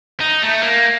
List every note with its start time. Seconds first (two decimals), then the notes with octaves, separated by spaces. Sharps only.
0.20 D#4
0.42 A3
0.63 A#3